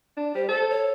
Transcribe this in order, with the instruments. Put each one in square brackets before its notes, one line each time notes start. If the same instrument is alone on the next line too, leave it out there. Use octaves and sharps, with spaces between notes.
[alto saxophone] D4
[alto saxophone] G3 [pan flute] C5
[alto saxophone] A4 [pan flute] C5
[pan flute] C#5